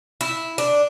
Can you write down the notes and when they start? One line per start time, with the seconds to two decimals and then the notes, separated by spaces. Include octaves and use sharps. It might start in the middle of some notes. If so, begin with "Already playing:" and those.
0.21 E4
0.58 D4